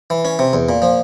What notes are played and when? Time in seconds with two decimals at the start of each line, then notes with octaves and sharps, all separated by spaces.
0.10 E3
0.25 C#4
0.39 C3
0.53 E2
0.69 A#2
0.82 F3